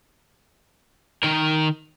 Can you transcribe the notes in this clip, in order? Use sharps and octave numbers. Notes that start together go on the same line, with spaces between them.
D#3 A#4